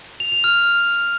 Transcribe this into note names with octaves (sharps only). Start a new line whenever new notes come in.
F7
F7
F6